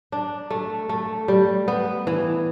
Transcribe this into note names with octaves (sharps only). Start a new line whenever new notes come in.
D4
A3
A3
G3
B3
E3